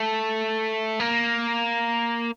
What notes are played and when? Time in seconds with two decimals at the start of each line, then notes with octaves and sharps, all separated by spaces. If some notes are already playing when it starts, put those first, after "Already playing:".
Already playing: A3
1.00 A#3